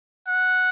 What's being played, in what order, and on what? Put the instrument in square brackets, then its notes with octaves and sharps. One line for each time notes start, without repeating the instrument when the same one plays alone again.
[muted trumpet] F#5